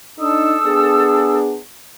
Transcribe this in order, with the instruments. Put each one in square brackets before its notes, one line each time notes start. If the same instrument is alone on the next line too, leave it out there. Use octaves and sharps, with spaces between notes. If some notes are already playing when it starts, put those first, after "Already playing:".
[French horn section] D4 D#4 [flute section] A4 D#6 E6
[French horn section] B3 D4 G#4